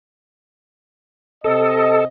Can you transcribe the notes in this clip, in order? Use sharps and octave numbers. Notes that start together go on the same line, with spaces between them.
C3 C4 A4 D#5